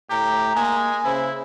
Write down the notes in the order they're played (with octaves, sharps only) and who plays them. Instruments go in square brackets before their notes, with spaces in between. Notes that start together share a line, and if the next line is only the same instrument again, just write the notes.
[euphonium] A2 [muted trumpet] G4 [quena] A#5
[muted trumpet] G#3 [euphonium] A#3 [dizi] G#5
[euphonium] C#3 [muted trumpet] E4 [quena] C5